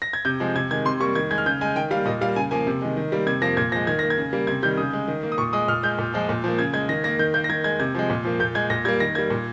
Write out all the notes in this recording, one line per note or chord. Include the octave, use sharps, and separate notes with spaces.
A#6
G#6
C3 G6
F3 G#3
C3 G#6
D#3 G#3 G#6
C3 C6
G3 A#3 C#6
D#3 G#6
G#3 G#6
F6
C#3 G6
G#3 G#5
D#3 G5
G3 A#3 F5
A#2 D#5
G3 A#3 F5
C#3 G#5
F3 A#3 G#5
C3
D#3 G#3
D#3
G3 A#3
C3 G#6
F3 A#3 A#6
A#2 G#6
F3 G#3 A#6
D#3 G#6
A#3 A#6
G#6
C#3
G3 A#3
C3 G#6
D#3 G3 G6
C#3 D#6
G#3
D#3
A#3
D#6
A#2 C#6
G#3 D#6
A#2 F6
G#3 G6
A#2
F3 G#3
A#2
F3 A#3
C#3 G#6
G#3 G#6
D#3 A#6
A#3 A#6
D#3 G6
A#3 G6
A#6
D#3 G#6
G#3 G#6
C3 G#6
F3 G#3
A#2
F3 A#3
A#2 G6
G#3 G#6
A#2 A#6
G3 A#3 G#6
D#3 A#6
G3 A#3 G#6
A#2